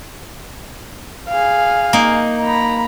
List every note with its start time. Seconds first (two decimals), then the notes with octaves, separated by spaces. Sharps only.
1.29 G#4 F5
1.93 A#3 D#4
2.45 A#5 B5